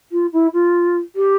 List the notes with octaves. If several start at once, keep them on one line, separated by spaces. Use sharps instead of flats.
F4
E4
F4
G4